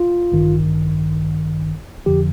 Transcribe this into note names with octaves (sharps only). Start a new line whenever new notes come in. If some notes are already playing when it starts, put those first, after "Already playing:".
Already playing: F4
A1 G2 D#3
F2 D3 F3 G4